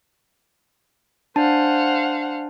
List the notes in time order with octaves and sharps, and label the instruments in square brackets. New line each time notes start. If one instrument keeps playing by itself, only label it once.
[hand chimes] D4 A5 [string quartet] C5 F5 F#5